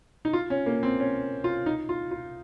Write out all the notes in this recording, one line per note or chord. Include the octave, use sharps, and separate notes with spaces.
D#4
F4
C#4
A#3
C4
C#4
F4
D#4
F4
F4